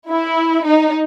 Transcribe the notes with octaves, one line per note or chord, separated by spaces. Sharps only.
E4
D#4